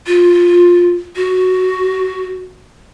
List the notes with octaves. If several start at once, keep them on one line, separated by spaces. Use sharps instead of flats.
F4
F#4